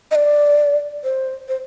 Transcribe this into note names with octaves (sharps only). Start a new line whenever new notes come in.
D#5
D5
C5
C5